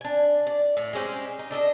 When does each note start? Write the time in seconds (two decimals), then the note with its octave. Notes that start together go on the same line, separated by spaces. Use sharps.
0.01 D4 G#5
0.47 D5
0.77 A2
0.93 G#3 C4 C#4 G4
1.39 D#4
1.51 D4 A4 A#4 D#5